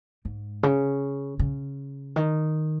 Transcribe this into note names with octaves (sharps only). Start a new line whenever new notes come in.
G#2
C#3
C#3
D#3